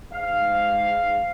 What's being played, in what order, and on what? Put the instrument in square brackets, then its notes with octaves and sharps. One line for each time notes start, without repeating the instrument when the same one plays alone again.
[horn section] G#2 F5